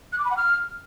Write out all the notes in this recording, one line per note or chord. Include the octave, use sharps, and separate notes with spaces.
F#6
D6
B5
F#5
F6